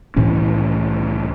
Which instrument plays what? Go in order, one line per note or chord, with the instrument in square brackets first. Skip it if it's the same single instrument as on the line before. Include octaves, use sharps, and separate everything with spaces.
[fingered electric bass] C2 A2 E3 C#4